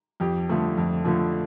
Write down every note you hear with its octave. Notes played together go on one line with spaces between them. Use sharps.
F2 G4
D3 F3 A3
F2
D3 F3 A3